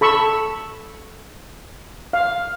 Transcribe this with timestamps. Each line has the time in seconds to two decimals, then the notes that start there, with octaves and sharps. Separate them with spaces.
0.01 A4 B5 C#6 E6
2.13 F5